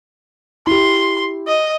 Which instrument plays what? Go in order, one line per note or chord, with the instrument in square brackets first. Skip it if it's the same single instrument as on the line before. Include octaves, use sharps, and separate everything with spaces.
[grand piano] E4 G4 [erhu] C6
[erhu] D#5